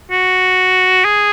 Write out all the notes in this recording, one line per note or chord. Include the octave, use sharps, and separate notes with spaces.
F#4
G#4